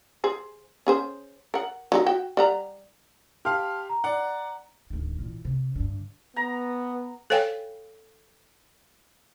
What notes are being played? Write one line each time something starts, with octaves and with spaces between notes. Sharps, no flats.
G#4 C5
C#4 G#4 C5
A#4 F#5
F#3 B3 D#4
F#4 G5
G3 F#5 A#5
G4 F5 A5 C6 F6
A#5
D5 F#5
D1 D#3
A#2 E3
C3
G2 D3
B3 A#5
A4 C5 C#5 F5 G5 G#5